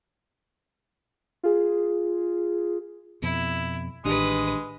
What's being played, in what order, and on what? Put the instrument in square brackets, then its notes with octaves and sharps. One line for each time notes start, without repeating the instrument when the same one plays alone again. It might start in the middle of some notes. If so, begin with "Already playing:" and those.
[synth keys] F4 G#4
[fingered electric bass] F2 B2 [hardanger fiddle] E4
[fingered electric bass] A1 [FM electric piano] D#3 D4 G4 [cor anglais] G#3 [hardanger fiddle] B4 D#6